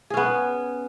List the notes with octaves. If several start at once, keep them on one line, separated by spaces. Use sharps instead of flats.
B3 C#4 G#4